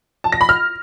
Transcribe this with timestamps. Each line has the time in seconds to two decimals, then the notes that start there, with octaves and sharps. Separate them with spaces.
0.24 A5
0.32 A#6
0.41 B5
0.49 F6